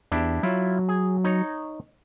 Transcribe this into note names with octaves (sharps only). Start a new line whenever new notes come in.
E2 D4 E4 G4
F#3 E4 F4
G#4
D#4 C#5 A#5